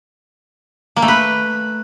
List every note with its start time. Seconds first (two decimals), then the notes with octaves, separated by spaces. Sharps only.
0.96 A#3
1.02 A3
1.08 B4